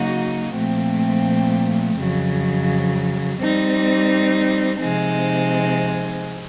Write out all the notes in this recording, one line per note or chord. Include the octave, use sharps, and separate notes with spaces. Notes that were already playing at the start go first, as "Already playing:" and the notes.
Already playing: C#3 F#3 A#3 D#4 F#4
A#2 F3 A3 C4
F2 C#3 F#3
G3 C4 D#4
C3 F3 G#3 C4 D#4